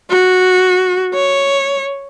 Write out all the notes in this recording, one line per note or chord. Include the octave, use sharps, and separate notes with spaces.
F#4
C#5